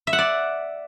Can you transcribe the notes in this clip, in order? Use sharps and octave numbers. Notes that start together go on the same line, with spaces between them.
E5
F#5
D5